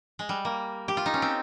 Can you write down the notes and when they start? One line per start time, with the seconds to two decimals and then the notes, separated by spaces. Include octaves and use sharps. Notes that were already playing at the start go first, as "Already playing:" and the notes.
0.19 G#3
0.29 G3
0.45 A#3
0.88 G4
0.97 F4
1.06 D#4
1.14 C#4
1.22 C4